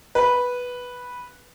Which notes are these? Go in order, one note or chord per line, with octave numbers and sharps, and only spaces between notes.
B4